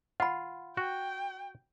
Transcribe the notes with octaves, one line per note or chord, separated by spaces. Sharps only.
F4 F#5 B5
F#4 G5